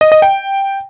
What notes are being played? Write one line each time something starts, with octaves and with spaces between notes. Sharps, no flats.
D#5
D#5
G5